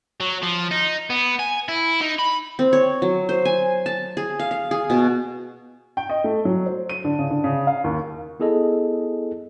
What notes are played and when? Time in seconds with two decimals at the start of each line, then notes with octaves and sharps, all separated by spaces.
0.20 F#3
0.43 F3
0.71 D#4
1.10 B3
1.39 G#5
1.68 E4
2.01 D#4
2.19 B5
2.59 C4
2.73 C#5
3.02 F#3
3.29 C5
3.45 G#5
3.86 A5
4.17 G#4
4.39 F5
4.51 F5
4.71 G#4
4.90 B2
5.97 G5
6.10 D#5
6.24 A3
6.45 F#3
6.66 C5
6.89 D#7
7.04 D3
7.19 C#3
7.30 D3
7.44 C#3
7.67 F5
7.84 D#2
8.40 B3 E4 G#4 A4 D#5